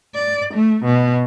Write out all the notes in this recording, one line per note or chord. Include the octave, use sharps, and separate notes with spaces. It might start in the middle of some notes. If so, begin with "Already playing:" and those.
D5
A3
B2